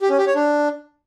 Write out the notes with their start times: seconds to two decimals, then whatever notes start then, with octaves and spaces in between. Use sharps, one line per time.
0.01 G4
0.09 C#4
0.18 G4
0.27 C#5
0.35 D4